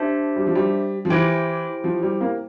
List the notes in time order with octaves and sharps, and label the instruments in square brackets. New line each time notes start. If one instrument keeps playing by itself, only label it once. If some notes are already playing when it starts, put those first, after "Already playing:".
Already playing: [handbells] D4 G4 C5 E5 A5
[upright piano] G3
F3
G3
F3
[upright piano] E3 [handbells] E4 G4 C5 G5
[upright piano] F3
G3
A#3